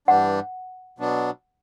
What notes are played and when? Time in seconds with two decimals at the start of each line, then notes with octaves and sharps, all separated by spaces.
0.08 G2 E3 G3 D4 F#5
0.99 B2 F#3 B3 D4